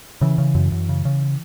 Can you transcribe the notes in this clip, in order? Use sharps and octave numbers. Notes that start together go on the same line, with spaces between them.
C#3 E3
C#3
F#2
F#2
C#3
C#3